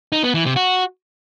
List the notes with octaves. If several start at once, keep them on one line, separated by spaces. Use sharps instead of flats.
D#4
B3
E3
C3
F#4